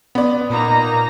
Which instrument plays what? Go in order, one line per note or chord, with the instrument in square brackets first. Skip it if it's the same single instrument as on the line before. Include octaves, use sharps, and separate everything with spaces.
[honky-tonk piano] B3 D5
[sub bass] A#2 [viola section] A#3 D#4 A#5